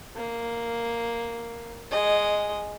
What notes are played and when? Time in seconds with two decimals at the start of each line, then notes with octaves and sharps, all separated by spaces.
0.16 A#3
1.91 G#3 D#5